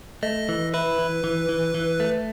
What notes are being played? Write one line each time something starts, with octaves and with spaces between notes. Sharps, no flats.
A3 D#5
E3
E4 B4
E3
E3
E3
E3
A3